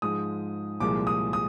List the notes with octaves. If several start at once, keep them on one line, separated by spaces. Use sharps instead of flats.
G#2 F3 G#3 D#6
C2 A#2 F3 G#3 D6
D#6
D#6